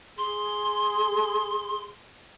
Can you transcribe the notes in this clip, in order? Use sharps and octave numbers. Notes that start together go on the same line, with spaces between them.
G#4 C6